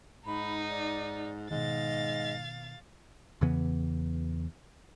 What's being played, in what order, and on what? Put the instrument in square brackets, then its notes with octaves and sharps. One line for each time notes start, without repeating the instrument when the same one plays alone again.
[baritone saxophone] G#2 [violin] D#4 [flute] B5
[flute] D5
[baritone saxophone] G#2 [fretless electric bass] B2 D#3 [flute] D#5 [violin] F5 A6
[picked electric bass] E2 C#3 E3 B3